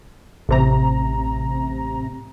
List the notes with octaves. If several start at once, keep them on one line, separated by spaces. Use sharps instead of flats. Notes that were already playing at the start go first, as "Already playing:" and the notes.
A1 C3 A#5